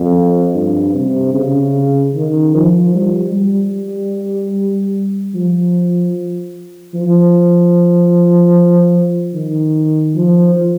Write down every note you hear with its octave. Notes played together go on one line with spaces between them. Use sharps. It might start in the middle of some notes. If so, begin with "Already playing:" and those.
Already playing: F2
G2
C3
C#3
D#3
F3
G3
G3
F3
F3
D#3
F3